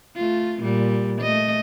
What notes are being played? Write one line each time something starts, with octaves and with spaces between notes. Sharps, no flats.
A3 F4
A#2 G3
A3 D#5